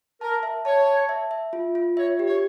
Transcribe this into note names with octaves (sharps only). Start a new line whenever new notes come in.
A#4 A5
E5
C#5 A5
A5
E5
E5
F4
F4
C#5 E5
G4
C#5